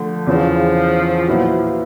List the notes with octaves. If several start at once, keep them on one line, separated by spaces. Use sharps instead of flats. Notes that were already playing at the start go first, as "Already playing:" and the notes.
Already playing: D3 F3 A3
E2 C#3 E3 F3
A#2 F#3 B3 E4